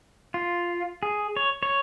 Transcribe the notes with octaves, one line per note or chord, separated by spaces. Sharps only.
F4
G#4
C#5
C#5